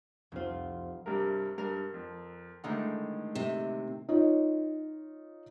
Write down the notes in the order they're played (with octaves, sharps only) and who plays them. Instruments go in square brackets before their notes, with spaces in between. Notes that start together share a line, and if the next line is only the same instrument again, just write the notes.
[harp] F1 F4 [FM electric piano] C2 F2 C4
[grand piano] G2 C3 A#4
[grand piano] G2 [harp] A#4
[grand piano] F2
[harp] A2 D#3 D#4 [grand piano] D3 G#3
[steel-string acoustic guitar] C3
[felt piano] D#4 F4 C#5